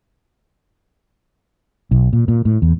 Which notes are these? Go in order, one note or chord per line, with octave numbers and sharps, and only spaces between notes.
B1
A#2
A#2
A2
E2